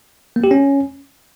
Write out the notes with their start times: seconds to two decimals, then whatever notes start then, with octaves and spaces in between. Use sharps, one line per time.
0.36 A#3
0.44 G4
0.51 C#4